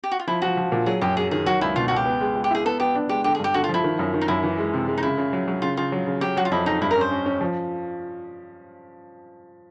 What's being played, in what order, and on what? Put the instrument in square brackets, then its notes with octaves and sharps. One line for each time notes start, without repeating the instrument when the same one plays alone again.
[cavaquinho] G4
F#4
F4
[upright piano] F3 [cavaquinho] E4
[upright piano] F3 [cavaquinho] F#4
[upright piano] F3
A#2
[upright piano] F#3 [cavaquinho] G#4
[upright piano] F#2 [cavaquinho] G4
[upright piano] F#3 [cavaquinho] G#4
[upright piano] D#3 [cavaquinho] G#4
[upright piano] F#3 [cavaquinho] F#4
[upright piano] C#2 [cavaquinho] E4
[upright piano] B2 [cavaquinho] F4
[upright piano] C#2 [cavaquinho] F#4
[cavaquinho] G4
[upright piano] B3
G#3
G#3
[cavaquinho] G4
[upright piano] E4 [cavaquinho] G#4
[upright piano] B3 [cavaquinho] A4
[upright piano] B3 [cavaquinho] G4
[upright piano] D4
[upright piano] G#3 [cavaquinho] G4
[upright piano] D3 [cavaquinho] G4
[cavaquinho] G#4
[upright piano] G2 [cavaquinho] G4
[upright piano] D3 [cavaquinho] F#4
[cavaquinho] F4
[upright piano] F3 [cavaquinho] E4
[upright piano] D#3
F#2
D#3
[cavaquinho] D#4
[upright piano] F#2 [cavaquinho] E4
[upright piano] E3
G#3
C3
G#3
[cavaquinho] D#4
[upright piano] C#3 [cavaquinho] E4
[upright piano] C#3
F#3
F#3
[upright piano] C#3 [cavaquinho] F4
[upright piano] C#3 [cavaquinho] F4
[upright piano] F#3
C#3
[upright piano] F#3 [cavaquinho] G4
[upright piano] F#3 [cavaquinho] F#4
[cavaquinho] F4
[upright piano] F2 [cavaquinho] E4
[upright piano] F2 [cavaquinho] D#4
[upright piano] G2 [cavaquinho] E4
[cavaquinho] A#4
[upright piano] C#4 [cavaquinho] C5
[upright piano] C#4
C#4
F3